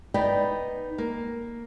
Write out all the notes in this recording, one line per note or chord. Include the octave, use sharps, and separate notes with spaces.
B3 D#4 D5 G5
A#3